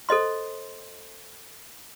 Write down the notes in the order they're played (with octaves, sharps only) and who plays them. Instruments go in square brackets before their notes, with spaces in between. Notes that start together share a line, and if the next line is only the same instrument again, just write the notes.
[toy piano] A4 C5 D#5 C6